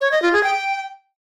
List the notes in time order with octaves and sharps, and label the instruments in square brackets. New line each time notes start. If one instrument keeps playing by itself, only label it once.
[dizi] C#5
D#5
F4
G#4
G5